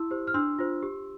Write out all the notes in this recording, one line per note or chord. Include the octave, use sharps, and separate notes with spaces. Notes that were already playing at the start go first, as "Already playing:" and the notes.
Already playing: E4 C6 E6
G4 C5
F6
D4 C6 E6
F4 C5
G4